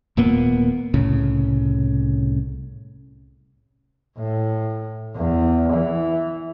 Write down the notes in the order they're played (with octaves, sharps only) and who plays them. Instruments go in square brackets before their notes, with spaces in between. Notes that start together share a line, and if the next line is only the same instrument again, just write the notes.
[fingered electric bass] D#1 A#2 A#3 B3
C2 A2 C#3
[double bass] A2
E2
E3